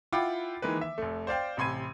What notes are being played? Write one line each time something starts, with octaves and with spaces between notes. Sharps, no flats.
E4 F4 F#5 G5 B5 D6
D#3 E3 G#3 A#3 B4
E5
F1 A3
C5 D5 F5 G5
A1 C3 B5 C6 G#6 D#7